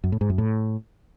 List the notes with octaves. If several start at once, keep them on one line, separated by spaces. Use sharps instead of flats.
F#2
A2
G#2
F#2
A2